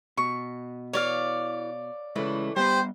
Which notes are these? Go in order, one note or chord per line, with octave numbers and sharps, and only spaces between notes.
B2 C#6
E3 C#5 D5 F5
C#3 E3 G#3 A3 E4
G3 B3 G4 B4 C5